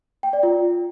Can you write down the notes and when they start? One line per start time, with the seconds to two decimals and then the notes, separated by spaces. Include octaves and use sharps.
0.23 G5
0.33 D5
0.43 F4